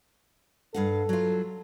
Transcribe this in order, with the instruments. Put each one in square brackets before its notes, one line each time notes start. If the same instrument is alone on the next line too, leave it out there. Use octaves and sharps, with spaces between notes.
[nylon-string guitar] G2 F5 F#5 [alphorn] A4
[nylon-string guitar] F#3 F4